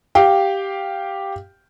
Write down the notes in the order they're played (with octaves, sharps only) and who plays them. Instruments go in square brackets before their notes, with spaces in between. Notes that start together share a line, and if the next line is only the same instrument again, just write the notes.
[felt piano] G4 F5 G5